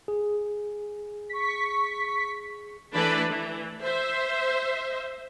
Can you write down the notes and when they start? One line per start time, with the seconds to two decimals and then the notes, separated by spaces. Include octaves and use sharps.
0.08 G#4
1.29 C#6 B6
2.93 E3 A3 D4 B4 D5 B5
3.30 E3
3.82 C5 E5